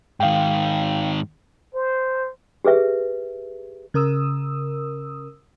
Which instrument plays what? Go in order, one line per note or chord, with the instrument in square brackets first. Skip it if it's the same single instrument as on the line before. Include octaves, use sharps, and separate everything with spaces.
[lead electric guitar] G#2 D#3 [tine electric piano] F5 G5
[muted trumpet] C5
[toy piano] G4 G#4 B4 E5
[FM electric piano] C#3 A#4 D#6 E6